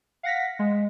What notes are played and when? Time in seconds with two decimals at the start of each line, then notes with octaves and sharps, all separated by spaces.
0.23 F5 F#5 A#6 B6
0.59 G#3